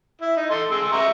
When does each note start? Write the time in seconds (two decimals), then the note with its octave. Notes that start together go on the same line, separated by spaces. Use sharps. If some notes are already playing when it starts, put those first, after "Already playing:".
0.21 E4
0.37 D#4
0.51 A4 C6
0.71 G#3 C6 E6
0.92 E5 A#5 C#6